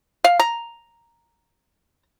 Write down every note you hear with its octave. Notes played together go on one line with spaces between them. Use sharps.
F5
A#5